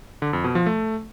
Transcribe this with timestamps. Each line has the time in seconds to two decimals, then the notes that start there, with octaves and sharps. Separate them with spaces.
0.22 D3
0.33 F2
0.44 B2
0.55 F3
0.66 A3